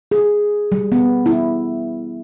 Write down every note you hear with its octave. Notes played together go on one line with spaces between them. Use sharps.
G#4
G3
B3
E4